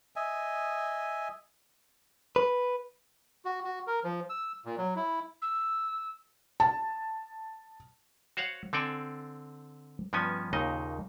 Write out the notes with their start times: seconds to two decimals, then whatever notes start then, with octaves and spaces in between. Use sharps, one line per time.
0.16 D#5 E5 G#5
2.36 B4
3.45 F#4
3.64 F#4
3.87 A#4
4.04 F3
4.30 E6
4.65 A#2
4.78 F#3
4.96 E4
5.42 E6
6.60 A5
8.37 F#4 C5 C#5 F5 F#5
8.73 D3 C4 A4 D5 G5 G#5
10.13 G2 F3 B3 C#4 G#5
10.53 D#2 A#2 C#3 D#4 D#5